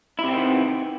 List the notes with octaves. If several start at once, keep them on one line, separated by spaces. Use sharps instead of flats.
C3 D#3 B3 C4 E4